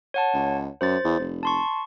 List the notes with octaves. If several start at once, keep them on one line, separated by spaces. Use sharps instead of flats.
C#5 F#5 A5
C#2
F#2 C5 A6
E2
F1
A5 C6 C#6